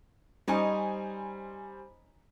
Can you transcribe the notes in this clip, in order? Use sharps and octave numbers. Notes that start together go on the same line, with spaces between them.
G3 C#4 D#4 C5 D#5 G#5